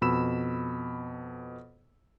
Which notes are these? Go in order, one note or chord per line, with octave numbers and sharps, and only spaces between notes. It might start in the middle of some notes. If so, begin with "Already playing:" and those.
F2 B2 B5 E6 E7